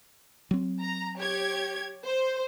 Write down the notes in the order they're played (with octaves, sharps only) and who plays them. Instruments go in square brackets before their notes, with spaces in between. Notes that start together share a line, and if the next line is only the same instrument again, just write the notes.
[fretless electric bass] F#3 C4
[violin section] A#5
G4 C#5 G#6
C5